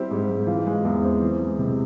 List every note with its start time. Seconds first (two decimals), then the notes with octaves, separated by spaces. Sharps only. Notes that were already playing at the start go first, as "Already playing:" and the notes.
Already playing: G3 C4 E4 G4
0.11 G#2
0.29 G#2
0.47 E3 F4
0.67 G#3
0.84 E2
1.04 C4
1.22 E3
1.40 G#3
1.59 C3